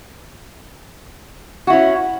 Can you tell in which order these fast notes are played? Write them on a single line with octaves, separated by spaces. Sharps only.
F#4 E4 C#4